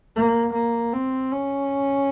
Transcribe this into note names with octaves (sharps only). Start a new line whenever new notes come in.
A#3
A#3
C4
C#4